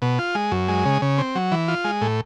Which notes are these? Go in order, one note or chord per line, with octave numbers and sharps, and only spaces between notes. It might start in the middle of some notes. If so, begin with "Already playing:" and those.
B2
F4
G#3
F#2
G#3
C#3
C#3
C4
F#3
E3
F4
G#3
A2